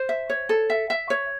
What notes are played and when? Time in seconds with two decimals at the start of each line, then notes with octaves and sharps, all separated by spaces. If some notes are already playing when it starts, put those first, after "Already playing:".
Already playing: C5
0.09 E5
0.30 C#5
0.49 A4
0.70 E5
0.90 E5
1.10 C#5